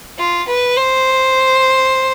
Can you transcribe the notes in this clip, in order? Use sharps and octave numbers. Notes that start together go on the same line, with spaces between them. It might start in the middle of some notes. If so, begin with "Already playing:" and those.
F4
B4
C5